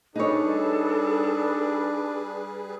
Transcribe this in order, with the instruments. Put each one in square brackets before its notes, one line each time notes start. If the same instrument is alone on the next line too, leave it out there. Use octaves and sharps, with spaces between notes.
[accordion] G3 G#4 B4 [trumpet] D4 [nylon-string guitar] D#4 C#5 [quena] A4